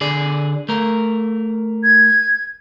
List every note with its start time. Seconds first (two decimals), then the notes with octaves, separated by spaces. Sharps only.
0.01 D3 G#4 D5
0.69 A3 A#4
1.83 G#6